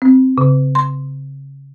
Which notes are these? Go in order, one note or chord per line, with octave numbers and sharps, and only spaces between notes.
C4
C#3
C6